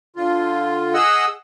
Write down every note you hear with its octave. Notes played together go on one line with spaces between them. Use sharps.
D3 F4
G#4 D#5 F#5 E6